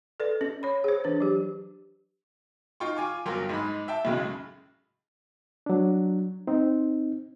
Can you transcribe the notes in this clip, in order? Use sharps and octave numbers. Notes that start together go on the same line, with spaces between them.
A4 B4 D5
C#4
C#5 B5
G#4 C5
E3 D4 B4
F#3 G4
D#4 F4 G5 C#6
F4 G#5 D6
G1 F#3 A#4 G5 C6
G#2 G#3 B5
E5 G5 A5
B1 F#2 A2 C#3 G#3
F#3 D4
C4 D#4